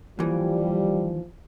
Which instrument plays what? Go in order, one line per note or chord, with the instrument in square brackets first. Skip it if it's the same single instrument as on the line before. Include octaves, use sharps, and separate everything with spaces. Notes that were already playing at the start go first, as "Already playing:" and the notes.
[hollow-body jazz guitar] D#2 E3 [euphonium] F3 [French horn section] G3